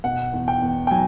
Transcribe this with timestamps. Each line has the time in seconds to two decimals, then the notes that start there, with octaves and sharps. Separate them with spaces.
0.04 B2 F#5
0.33 E2
0.48 G5
0.62 E2
0.87 G5
0.91 F#3 G#5